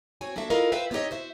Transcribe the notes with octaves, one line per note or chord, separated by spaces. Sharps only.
C4 F#4 C#5 G#5
A#3 D4 F#4 A4 E5
E4 F4 A4 A#4 D#5 F5
F4 B4 C5 E5 F5 G5
B3 C4 D#4 G4 C#5 D#5
F#4 C5 E5